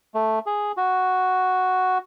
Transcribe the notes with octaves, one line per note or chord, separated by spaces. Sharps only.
A3
G#4
F#4